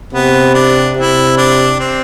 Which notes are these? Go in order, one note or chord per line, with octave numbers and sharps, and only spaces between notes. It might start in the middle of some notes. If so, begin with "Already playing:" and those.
C3 B3
D4
C3 E4
D4
C4